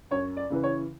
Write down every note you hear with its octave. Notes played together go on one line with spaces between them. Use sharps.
F#2 C#5
D5
C#3 E3 B4
C#5